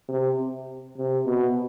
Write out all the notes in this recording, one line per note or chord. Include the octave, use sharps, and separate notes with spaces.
C3
C3
B2